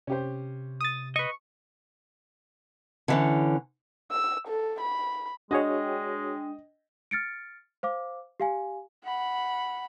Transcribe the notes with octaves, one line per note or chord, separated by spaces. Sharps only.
C3 C#4 G4 C5
D#6 A6
B4 D#5 C#6
D3 E3 C#4
E6
A4
B5
G#3 D4 F#4 G#4 C#5 D#5 G5
F6 A6 C#7 D7
C5 F5 D6
G4 F5 G#5
F#5 B5